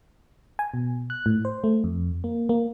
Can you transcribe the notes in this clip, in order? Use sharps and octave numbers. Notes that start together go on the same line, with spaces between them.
G#5
B2
F#6
A2
C5
A3
F2
A#3
A#3